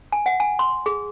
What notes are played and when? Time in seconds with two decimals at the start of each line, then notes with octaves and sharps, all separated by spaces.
0.12 G#5
0.26 F#5
0.40 G#5
0.59 C6
0.86 G#4